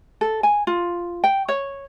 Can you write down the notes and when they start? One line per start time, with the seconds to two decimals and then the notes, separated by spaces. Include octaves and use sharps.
0.21 A4
0.43 G#5
0.67 F4
1.24 G5
1.48 C#5